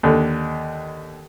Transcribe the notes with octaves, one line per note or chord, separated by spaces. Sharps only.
D#2 D3